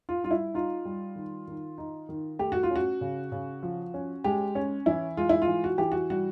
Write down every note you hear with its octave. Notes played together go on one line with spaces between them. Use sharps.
F4
G3 F4
E4
D#4 F4
G3
D#3
D#3
D#4
D#3
A3 G4
F#4
F4
C#4 F#4
C#3
C#3
F3
C#4
G#3 G4
C#4
E3 E4
G#3 F4
E4
F4
E3
F#4
E3 G4
F#4
G3 F#4